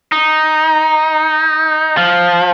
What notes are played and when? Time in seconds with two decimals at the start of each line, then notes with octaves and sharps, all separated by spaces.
0.12 D#4
1.97 F3